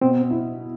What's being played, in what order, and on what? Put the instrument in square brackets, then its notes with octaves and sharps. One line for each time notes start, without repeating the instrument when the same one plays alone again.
[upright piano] B2 [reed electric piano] C4
[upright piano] E4